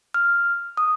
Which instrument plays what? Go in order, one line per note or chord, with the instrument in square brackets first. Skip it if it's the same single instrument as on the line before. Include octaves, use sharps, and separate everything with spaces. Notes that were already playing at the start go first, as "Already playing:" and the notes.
[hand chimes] F6
D#6